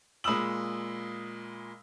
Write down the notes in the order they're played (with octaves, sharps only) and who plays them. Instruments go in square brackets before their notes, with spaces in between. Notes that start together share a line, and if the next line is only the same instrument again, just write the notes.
[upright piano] A#2 G#3 B5 D#6 E6 F#7